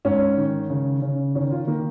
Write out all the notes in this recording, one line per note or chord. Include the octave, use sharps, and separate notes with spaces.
G#2 C#4
D#3
C#3
C#3
D#3 C#4
F4
D#3 A#3